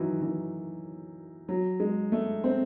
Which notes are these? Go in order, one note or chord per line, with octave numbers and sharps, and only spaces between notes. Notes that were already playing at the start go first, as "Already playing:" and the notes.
Already playing: D#3 E3 F#3
E3
F#3
G#3
A3
C4